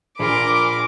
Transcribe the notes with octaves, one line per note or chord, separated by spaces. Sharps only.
A#1 F4 G#4 A#4 G#5 B5 D6